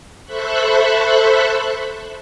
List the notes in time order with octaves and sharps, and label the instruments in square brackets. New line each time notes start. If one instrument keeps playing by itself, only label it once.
[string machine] A4 C5 E5 B5 C#6 F#6